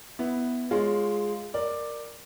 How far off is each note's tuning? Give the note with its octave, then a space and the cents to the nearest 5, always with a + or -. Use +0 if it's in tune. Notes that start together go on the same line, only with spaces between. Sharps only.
B3 +5 E4 -5
G#3 +0 F4 +5 C#5 +0
A#4 +0 D5 +10